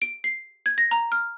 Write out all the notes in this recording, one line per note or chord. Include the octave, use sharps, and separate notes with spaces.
D7
C7
G#6
A#6
A#5
F6